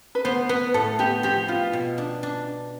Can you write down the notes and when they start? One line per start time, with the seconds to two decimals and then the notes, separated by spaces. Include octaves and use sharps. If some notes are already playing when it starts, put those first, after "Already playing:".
0.15 B4
0.25 B3 C5
0.49 B3 B4
0.74 A2 A4
0.99 B3 G4
1.23 F3 G4
1.48 B3 F4
1.73 B2
1.98 D4
2.23 D4